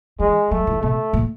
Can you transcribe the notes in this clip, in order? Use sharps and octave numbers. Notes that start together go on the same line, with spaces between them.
E3 G#3
F#3 A3
E3
B2 A3
A2